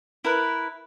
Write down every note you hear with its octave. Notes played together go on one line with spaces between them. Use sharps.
E4 A#4 B4